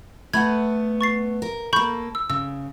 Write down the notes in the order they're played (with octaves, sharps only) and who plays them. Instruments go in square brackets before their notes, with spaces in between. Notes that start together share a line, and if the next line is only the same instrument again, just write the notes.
[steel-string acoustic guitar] A3 B3 F#5 [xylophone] B5 G#6
[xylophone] C#6 A6 C7
[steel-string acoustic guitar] A#4
[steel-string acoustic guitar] A#3 A4 [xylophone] B5 C#6 G6
[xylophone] E6
[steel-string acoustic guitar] C#3 [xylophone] E6